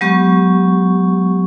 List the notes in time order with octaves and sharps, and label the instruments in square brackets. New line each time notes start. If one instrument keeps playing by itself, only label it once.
[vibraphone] F#3 G#3 B3 G4 C#6